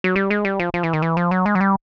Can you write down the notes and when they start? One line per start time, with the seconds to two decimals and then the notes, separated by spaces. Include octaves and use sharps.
0.04 F#3
0.16 G3
0.30 G#3
0.45 G3
0.60 F3
0.74 F3
0.83 E3
0.93 D#3
1.02 E3
1.17 F3
1.31 F#3
1.46 G#3
1.55 F#3
1.61 G3